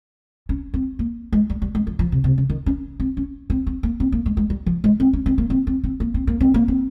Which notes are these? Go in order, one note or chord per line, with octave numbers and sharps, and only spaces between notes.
C#4
C4
A#3
G#3
G3
G3
G#3
F3
F3
C3
C3
C#3
D#3
C#4
C4
C#4
C4
C4
A#3
C4
A#3
G#3
G#3
G3
F3
G#3
C4
C#4
C4
A#3
C4
C4
C4
A#3
C4
A#3
C4
A#3
C4